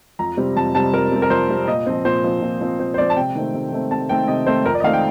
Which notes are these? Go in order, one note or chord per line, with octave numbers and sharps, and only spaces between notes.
F2 A#5
C3 G3 C4
F2 A5
C3 G3 C4 A5
F2 A#4
C3 G3 C4
A#4
F2 C5
C3 G3 C4
A#2 D#5
F3 C4
A#2 C5
F3 C4
A#2
F3 C4
A#2 C5
C5
F3 C4 D5
A5
C3 G5
D#3 A3 C4
C3
D#3 A3 C4
C3 A5
D#3 A3 C4 G5
C3 D#5
D#3 A3 C4 C5
F2 A#4
D5
D#5
D#3 A3 C4 F5
G5